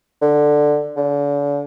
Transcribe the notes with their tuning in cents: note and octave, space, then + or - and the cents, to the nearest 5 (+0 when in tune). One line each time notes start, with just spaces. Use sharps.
D3 +10
D3 -40